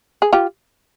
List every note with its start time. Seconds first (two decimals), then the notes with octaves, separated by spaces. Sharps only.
0.22 G#4
0.33 F4 G4